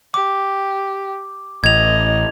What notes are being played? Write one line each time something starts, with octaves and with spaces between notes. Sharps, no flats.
G4 D6
A1 D#5 G#6 F7